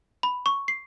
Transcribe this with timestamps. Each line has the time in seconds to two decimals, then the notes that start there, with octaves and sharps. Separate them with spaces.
0.23 B5
0.46 C#6
0.68 C7